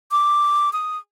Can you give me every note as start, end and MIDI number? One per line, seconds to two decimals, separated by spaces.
0.11 0.72 86
0.73 0.98 87